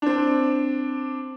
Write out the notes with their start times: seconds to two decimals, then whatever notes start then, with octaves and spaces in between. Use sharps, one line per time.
0.02 C4 D4